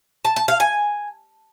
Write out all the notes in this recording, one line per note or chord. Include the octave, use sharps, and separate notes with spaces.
A5
A5
F5
G#5